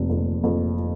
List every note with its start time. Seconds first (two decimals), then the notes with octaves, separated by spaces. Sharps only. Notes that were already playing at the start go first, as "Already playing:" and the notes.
Already playing: F1
0.09 F2
0.44 F2